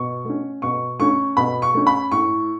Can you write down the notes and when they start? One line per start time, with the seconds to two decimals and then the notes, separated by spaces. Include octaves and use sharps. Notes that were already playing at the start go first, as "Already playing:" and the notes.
Already playing: B2 C#6
0.25 A3 C#4
0.62 B2 C#6
0.99 A3 C#4 C#6
1.37 B2 B5
1.62 C#6
1.74 A3 C#4
1.87 B5
2.11 A2 C#6